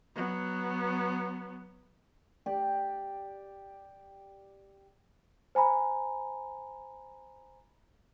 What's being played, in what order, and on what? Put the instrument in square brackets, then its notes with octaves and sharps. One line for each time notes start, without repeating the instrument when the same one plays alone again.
[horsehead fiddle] F#3 B3
[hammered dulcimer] G4 D5
[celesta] C5 G#5 A#5 B5